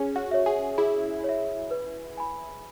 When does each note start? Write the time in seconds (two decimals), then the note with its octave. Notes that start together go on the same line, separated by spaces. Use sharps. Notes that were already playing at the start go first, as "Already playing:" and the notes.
Already playing: C#4 G#4
0.16 F#4
0.31 C#5 E5
0.46 G#4
0.78 E4 G#4
1.24 C#5 E5
1.71 B4
2.17 G#5 B5